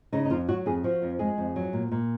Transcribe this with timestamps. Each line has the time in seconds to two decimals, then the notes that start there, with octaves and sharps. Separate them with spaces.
0.13 C#3 D#4
0.25 D#4
0.30 F2 F4
0.49 F#3 F#4
0.66 F2 G#4
0.84 F3 F#4
1.02 F2
1.19 G#3 G#4
1.38 F2
1.56 F#3
1.73 A#2
1.91 A#2